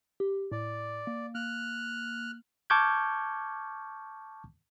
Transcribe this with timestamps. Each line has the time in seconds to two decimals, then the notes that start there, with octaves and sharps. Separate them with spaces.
0.20 G4
0.52 A2 D5
1.07 A#3
1.35 A#3 F6 F#6
2.70 A5 C#6 D6 F6 G6 G#6